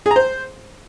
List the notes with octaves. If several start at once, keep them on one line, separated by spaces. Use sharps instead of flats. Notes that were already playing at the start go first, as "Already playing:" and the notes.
G#4
A#5
C5